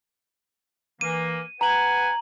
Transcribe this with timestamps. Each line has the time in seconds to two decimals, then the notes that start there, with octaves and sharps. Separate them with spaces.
1.01 E3 A#3 D#7
1.61 B4 F#5 G#5 A#5 F#7